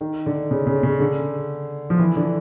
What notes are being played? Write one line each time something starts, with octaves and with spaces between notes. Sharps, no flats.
D#3
D3
C#3
C#3
C#3
D3
F3
E3
D3